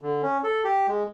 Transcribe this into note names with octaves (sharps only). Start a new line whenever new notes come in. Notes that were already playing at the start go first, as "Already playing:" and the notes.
D3
C#4
A4
G4
G#3